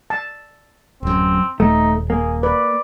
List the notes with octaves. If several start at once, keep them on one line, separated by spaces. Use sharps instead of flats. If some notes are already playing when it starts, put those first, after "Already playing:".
A5
D1 F#2 C4
D#1 A3 D#4
A#3 G#4
B4 D5